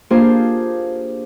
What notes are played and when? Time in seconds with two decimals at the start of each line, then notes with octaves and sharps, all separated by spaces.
0.10 A#3 D4 F4 G4 G#4 C5